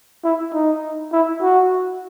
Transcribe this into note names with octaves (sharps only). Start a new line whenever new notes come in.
E4
D#4
E4
F#4